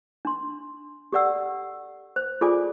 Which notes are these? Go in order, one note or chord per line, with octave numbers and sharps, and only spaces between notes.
D4 C6
G4 A4 D5 F#5 E6
C5
F4 G#4 A4 D5 G#5 D6